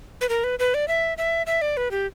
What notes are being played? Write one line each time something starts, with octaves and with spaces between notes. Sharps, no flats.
B4
A#4
B4
B4
D5
E5
E5
E5
D5
B4
G4